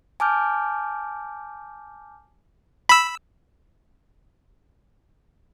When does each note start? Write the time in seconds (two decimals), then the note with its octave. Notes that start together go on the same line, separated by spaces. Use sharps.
0.20 G#5 A5 D6 F6 G6
2.89 B5 E6